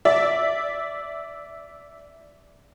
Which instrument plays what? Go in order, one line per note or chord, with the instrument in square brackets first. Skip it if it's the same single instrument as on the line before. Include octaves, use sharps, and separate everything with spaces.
[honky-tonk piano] D5 E5